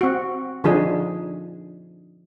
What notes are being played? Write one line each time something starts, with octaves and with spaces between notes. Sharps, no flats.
C4 F#4
D3 F3 D4 D#4 G#4